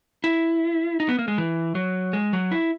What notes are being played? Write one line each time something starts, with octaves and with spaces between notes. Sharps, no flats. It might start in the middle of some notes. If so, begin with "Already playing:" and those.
E4
D#4
B3
A#3
G#3
E3
F#3
G#3
F#3
E4